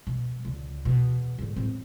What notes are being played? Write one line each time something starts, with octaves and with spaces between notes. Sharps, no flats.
B2
C#2 D3
E2 B2
G#2 D3
A2 C4